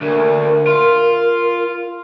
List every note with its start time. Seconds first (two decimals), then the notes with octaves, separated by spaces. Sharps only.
0.01 D2 A#4
0.67 F4